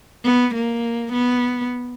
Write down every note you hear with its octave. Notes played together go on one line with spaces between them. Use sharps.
B3
A#3
B3